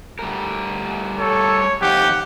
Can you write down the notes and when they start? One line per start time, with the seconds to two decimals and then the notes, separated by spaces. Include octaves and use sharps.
0.19 G3 A3 A#4
1.19 A4 C#5
1.82 F2 D#3 G4 F5 F#5